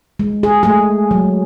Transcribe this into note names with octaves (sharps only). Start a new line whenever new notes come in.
G#3
G#4
G#3 A3 G#4
F#3